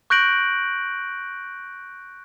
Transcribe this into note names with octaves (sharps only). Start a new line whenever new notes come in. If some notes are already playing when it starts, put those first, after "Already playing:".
C#6 F#6 G6 A#6 D7 F#7